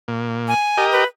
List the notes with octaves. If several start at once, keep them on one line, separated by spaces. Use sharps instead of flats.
A#2
G#5
G4 A#4 D#5
B4